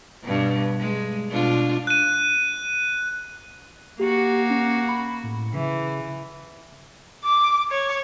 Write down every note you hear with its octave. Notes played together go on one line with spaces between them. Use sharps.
G2 B2
G#3
B2 D4 F4
F#6 D#7
A#3 F#4 G4
C#4
B5
A2
C#3 E3
D6
C#5